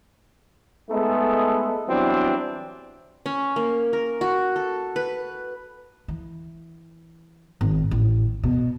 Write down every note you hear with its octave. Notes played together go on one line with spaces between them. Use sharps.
G#3 A3 B3 D#4 A4
E3 F#3 G3 B3 C4 D4
C#4
A#3
A#4
F#4
A4
B4
E3
G#1
A1
B2